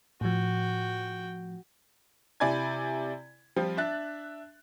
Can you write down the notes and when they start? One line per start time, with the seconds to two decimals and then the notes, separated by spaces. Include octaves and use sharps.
0.21 A2 F3 F#4 G5
2.40 C3 E4 D5 G#5 B5 G#6
3.56 F3 G3 C4 F4
3.77 D4 E5 F#6 A6